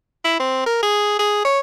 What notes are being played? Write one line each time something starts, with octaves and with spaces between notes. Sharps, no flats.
E4
C4
A#4
G#4
G#4
C#5